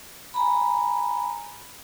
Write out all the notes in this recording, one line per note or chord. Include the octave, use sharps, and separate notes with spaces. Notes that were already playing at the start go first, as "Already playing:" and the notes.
G#5 A#5 B5